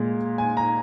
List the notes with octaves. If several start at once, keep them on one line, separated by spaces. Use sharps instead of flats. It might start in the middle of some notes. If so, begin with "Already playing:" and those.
Already playing: A#2 G#3
G#5
A#5